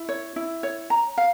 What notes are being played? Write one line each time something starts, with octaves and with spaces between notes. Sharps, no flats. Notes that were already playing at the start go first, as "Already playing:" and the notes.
Already playing: E4
C#5
E4
C#5
A#5
F5